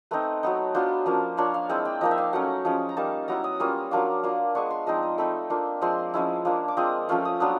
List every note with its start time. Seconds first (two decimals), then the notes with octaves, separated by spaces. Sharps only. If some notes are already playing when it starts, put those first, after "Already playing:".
0.11 A3 C4 D#4 B4
0.43 F#3 B3 D#4
0.75 F#3 B3 D4 F4 C5
1.06 F3 A#3 C#4
1.37 A#3 D4 F4 C#5
1.54 F5
1.69 G#3 C4 E4 G5
1.85 G5
2.01 F3 A#3 D#4 D#5
2.11 E5
2.18 F5
2.33 F#3 A3 C#4 F#5
2.65 F3 G#3 C#4
2.89 A#5
2.97 G3 A#3 D#4 A5
3.28 F#3 B3 E4 A#5
3.44 D#6
3.60 G3 A#3 C#4 F4 D#6
3.91 F#3 A#3 D4 F4 D6
4.23 A#3 D4 F4
4.55 G#3 B3 D4 C#6
4.71 C6
4.87 F3 G#3 C4 D#4 A#5
5.03 A#5
5.18 A3 C4 D#4 B5
5.50 A#3 D4 F4
5.81 F3 G#3 C4 C6
6.14 F3 G#3 C#4 E4
6.45 F3 A#3 D4
6.68 D6
6.77 G#3 C4 F4 D#6
7.09 F3 A3 C#4 F4
7.25 D#6
7.40 F#3 B3 D4 F4 D#6